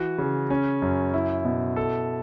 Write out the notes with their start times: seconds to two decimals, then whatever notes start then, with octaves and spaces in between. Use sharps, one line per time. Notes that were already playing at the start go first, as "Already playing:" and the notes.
Already playing: E3 F#4
0.18 C#3
0.50 C#4
0.82 F#2
1.14 E4
1.45 B2
1.76 A4